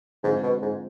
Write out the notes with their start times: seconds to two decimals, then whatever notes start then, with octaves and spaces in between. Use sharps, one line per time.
0.24 G#2 D3 F3 G#3 C4 F4
0.43 B2
0.62 G#2